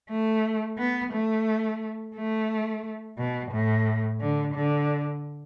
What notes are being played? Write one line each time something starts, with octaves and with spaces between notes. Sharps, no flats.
A3
B3
A3
A3
B2
A2
D3
D3